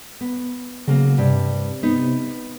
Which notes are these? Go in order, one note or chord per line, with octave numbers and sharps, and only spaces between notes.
B3
C#3 F#3 A#3
G2 C3
B3 D#4